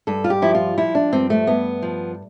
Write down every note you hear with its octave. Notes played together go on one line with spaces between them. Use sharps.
G2 A4
F4
G4
F3 E4
F4
F3 E4
D4
G2 C4
A3
G2 B3
F3